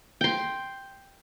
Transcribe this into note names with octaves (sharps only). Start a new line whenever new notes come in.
G5 C6